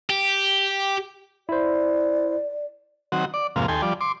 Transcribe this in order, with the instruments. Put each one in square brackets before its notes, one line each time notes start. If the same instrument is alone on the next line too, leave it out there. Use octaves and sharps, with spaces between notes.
[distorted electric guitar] G4
[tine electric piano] E4 C5 [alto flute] D5
[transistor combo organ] D#3 F#3 C4 F#4
D5
F2 G#2 C3 A#3 F5
D#2 A4 G5 G#5 C6
F3 G3 D5
C6 D6